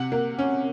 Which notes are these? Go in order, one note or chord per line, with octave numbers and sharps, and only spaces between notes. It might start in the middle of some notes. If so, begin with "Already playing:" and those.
Already playing: C3 F#5
A#3
C#4